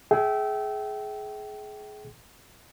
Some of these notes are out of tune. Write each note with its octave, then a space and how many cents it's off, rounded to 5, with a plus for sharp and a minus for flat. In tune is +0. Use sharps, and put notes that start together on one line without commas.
G#4 +20 E5 -10 G5 -25